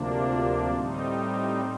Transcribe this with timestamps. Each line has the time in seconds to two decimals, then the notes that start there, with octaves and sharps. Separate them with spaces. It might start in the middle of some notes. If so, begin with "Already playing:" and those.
Already playing: D2 C3 F3 A#3 D4
0.70 A2 G3 C4 D#4